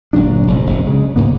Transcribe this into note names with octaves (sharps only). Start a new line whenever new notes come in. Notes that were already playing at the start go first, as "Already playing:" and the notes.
G1 A#2 F#3 D4
F1 C2
F1
C#3 G#3
C#2 G#2 A#3 B3